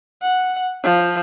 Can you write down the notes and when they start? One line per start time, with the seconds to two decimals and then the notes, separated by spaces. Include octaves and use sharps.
0.22 F#5
0.83 F3